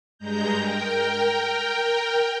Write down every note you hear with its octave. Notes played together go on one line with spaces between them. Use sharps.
G2 G#3 A#5 G6
A#4 G5